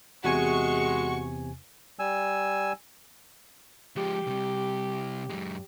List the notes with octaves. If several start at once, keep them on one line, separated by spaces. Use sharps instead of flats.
E2 C3 G#3 F#4 G#5 C#6
G3 G#5 E6
F3 G#3 G4
C3 G3
F#2 G#3